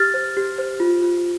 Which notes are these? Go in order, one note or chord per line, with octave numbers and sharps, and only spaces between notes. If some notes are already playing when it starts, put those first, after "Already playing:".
Already playing: G4 F6 A6
C5
G4
C5
F4
F4